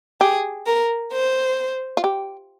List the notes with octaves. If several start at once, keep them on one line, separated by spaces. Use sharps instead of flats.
G4 G#4
A#4
C5
F4
G4